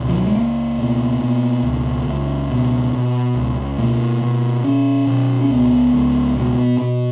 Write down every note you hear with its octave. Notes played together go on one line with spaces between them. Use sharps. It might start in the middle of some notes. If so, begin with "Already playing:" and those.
Already playing: C#2 B2
F3
F#3
G#3
C#2 A#3
B2
B2
C#2
C#2
B2
B2
C#2
B2 A#3
B2
B2 C#4
B2
C#4
C#2 B3
C#2
B2
B2